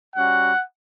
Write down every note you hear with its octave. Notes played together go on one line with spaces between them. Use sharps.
G3 C#4 F#4 F#5